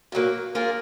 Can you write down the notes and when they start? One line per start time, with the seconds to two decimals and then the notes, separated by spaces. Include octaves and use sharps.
0.12 A#2 F#3 A#3
0.55 A#3 F4 G#4